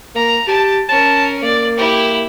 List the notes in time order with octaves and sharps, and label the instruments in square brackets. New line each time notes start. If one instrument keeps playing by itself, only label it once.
[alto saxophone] A#3 [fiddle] A#5
[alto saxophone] G4 [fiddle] A5
[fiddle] C#4 A#4 [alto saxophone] A5
[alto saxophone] A#3 [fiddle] D5
[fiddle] E4 G4